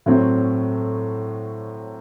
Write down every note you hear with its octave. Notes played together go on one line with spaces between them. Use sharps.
A2 F#3 A3 C4